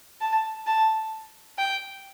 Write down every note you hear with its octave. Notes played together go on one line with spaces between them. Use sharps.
A5
A5
G5